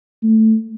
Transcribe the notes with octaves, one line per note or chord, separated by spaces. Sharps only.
A3